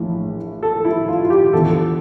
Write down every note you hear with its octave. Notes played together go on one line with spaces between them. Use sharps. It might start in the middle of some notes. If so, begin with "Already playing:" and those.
Already playing: A#1 A2 E3
A4
E4
F4
F4
G4
E2 D3 F3 A4